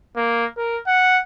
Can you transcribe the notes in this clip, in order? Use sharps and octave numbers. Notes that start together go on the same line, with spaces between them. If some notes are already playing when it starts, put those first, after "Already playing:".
A#3
A#4
F#5